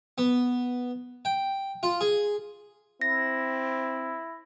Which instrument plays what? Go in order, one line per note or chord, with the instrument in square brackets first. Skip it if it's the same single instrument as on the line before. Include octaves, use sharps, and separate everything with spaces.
[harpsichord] B3
G5
F4
G#4
[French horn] C4 [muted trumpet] E4 [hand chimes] A#6